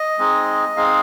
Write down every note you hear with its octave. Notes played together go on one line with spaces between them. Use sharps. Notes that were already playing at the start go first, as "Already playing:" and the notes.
Already playing: D#5
G#3 C4 D#4 G#4
G#3 C4 D#4 G#4 F5